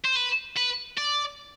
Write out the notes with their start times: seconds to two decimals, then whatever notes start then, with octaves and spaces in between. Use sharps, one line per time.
0.05 C5
0.16 B4
0.57 B4
0.98 D5